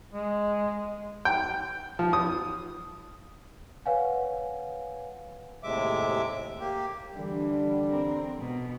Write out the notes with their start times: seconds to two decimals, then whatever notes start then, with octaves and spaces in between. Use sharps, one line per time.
0.13 G#3
1.25 G5
1.99 F3
2.13 D#6
3.86 B4 C#5 F5 F#5 G#5
5.63 D#2 A2 C3 G#3 E5 D6
6.60 A#3 G4
7.15 D3 E3 G3 D4
7.88 C4 A#4
8.39 B2